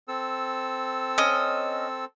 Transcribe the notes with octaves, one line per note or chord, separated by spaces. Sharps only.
C4 A4 E6
C#4 D#5